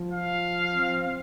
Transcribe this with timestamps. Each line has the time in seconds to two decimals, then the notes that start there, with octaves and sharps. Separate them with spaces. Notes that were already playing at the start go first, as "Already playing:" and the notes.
Already playing: F3
0.13 F5
0.73 C4